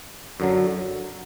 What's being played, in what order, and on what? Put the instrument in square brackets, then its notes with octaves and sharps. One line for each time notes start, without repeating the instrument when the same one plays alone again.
[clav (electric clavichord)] F#2 D3 F#3